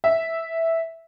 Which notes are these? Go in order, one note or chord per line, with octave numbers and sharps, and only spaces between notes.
E5